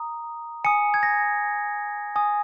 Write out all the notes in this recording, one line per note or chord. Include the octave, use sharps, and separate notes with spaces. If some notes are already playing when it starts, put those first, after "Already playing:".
Already playing: A#5 D#6
G#5 D#6 C#7
G#6
A#6
G#5 D#6